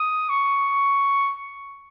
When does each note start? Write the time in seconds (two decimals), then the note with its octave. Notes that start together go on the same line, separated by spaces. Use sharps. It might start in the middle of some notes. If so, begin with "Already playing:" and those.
Already playing: D#6
0.29 C#6